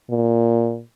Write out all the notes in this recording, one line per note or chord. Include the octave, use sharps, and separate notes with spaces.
A#2